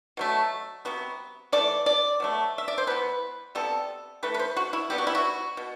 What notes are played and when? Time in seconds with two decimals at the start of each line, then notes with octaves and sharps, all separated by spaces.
0.17 B2 F#3 A3
0.85 C3 F#3 B3
1.52 E3 A3 D5
1.86 D5
2.20 B2 F#3 A3
2.58 E5
2.68 D5
2.78 C5
2.87 E3 B3 B4
3.55 C3 G3 B3 A4
4.23 E3 A3 B4
4.34 B4
4.39 C5
4.57 F#4
4.73 E4
4.90 C3 G3 B3 G4
4.98 F#4
5.07 E4
5.15 F#4
5.57 B2